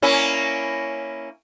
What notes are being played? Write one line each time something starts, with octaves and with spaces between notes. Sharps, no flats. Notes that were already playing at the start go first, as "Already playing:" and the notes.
A#3 C#4 E4